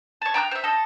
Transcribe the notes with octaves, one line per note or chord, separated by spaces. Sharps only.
C#5 A5
G5 A#5 D6 F#6
C5 E5
A4 D#5